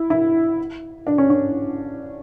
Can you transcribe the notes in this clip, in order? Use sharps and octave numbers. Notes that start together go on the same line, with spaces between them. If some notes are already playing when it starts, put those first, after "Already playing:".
Already playing: E4
E4
D4
C#4
C#4